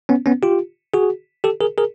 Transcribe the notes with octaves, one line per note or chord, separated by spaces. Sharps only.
B3 C#4
B3 C#4
F4 G4
F#4 G#4
G4 A4
G#4 A#4
G#4 A#4